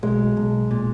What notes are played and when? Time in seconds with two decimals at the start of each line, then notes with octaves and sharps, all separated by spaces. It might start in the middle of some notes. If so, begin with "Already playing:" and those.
0.03 B1 G#3
0.37 B1
0.71 A#2